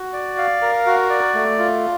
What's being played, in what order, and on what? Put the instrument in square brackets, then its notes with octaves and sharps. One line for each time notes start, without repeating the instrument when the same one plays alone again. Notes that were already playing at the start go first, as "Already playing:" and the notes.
Already playing: [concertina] F#4
D5
F5
A#4
F#4
D5
A3
F4